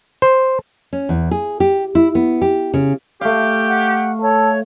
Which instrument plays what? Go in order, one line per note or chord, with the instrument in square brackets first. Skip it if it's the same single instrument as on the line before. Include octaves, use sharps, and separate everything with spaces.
[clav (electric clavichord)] C5
[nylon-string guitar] C#4
E2
G#4
G4
E4
B3
G4
C#3
[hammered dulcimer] A3 F5 [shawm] G4
[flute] F#5
[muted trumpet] A4 [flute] C#5